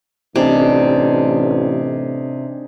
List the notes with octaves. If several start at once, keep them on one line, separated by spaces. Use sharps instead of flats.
A1 C3 D4 D#4 G#4